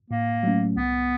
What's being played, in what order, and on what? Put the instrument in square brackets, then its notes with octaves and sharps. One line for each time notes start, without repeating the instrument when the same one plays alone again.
[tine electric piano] A2 [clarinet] A#3
[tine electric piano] F#3 A3 C#4
[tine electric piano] C2 [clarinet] B3